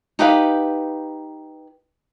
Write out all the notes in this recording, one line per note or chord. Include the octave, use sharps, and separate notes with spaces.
D#4 G4 B4 F5